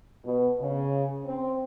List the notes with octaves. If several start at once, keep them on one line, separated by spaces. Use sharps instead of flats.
B2
C#3
C4